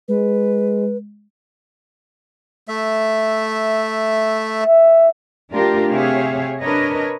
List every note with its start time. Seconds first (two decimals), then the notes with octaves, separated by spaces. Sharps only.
0.08 G#3 B4
2.68 A3 E5
4.64 E5
5.52 A3 D4 F4 G4 A#4
5.91 C3 G4 G#4 C#5 E5 F5
6.61 D4 A#4 B4 C#5 D#5